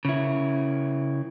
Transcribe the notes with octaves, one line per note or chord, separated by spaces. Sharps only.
C#3 E4